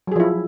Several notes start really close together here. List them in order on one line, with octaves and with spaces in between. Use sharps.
F#3 G#4 F3 E4